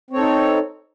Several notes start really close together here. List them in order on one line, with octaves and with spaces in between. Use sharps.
C4 C#5 A4 D#4